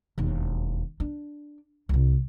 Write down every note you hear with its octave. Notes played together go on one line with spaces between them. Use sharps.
E1 D#2
D4
C2 C3